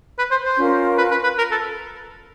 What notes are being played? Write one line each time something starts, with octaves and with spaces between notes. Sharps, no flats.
B4
C5
C5
C#4 F4 A#4
B4
B4
B4
A#4
A4